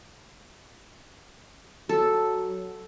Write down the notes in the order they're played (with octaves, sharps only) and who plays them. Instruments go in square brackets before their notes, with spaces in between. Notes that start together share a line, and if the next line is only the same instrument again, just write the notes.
[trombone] F#3 [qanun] A4